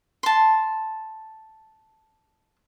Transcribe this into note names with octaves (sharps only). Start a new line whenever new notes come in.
A5 C6